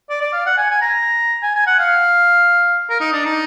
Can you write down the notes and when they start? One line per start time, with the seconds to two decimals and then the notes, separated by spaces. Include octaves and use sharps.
0.10 D5
0.21 D5
0.33 F5
0.46 F#5
0.57 G#5
0.70 G#5
0.82 A#5
1.43 G#5
1.55 G#5
1.67 F#5
1.79 F5
2.89 A#4
3.00 D#4
3.13 D4
3.25 D#4